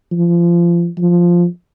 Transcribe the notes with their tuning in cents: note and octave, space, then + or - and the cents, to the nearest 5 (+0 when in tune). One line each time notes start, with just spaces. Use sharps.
F3 -25
F3 +0